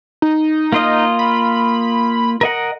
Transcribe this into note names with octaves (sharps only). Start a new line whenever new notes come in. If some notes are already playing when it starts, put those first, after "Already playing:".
D#4
A#3 F4 D#5
B5
A#4 D#5 F#5